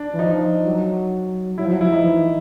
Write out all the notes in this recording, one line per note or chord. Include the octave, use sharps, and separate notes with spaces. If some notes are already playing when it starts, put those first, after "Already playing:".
Already playing: D4
E3
F3 D#4
F#3
F#3 E4
F3
F#3
F3 E4
D#4
E3